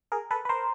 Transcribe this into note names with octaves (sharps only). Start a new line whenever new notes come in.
G#4 A#4
A4 B4
B4
A#4 C5